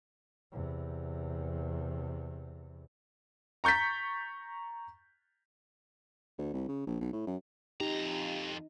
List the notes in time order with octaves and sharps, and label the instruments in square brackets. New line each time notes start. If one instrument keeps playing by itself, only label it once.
[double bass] E2 C3
[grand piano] A#5 C#6 G6 A6 B6
[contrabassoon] D2
C2
C#3
A#1
B1
A2
F#2
[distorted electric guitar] F2 A#5 [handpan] D#4 [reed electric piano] G4